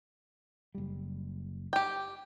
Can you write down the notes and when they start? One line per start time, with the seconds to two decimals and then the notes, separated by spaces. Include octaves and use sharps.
0.75 F#1 G3
1.73 G4 G5